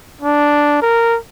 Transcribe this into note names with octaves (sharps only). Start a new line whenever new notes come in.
D4
A#4